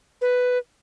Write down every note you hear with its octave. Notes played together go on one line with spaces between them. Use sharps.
B4